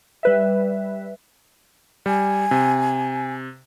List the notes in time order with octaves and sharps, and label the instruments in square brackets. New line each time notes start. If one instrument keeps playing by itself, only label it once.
[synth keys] G3 B4 E5
[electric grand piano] G3 [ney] G#5
[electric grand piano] C3